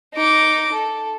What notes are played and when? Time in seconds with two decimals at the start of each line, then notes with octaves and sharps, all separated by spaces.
0.15 D#4 D6
0.72 A4